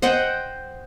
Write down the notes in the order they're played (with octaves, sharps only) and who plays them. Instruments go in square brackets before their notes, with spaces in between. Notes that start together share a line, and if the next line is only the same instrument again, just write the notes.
[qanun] C5 D#5 F#5 G5